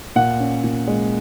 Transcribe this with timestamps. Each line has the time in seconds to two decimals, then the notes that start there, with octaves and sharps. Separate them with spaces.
0.16 A#2 F#5
0.40 C#4
0.64 A#2
0.87 G#3